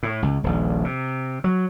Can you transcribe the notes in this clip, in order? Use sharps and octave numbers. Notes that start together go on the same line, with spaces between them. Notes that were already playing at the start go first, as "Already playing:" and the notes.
A2
C#2
D#1 A#1
C3
F#3